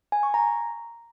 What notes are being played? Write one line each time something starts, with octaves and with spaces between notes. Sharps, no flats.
G#5
C#6
A#5